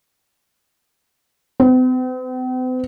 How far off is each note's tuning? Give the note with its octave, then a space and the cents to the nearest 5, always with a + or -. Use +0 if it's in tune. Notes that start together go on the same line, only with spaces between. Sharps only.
C4 -45